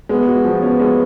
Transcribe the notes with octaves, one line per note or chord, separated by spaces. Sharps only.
G#3 B3
F#4
F3
B3 C#4
G#3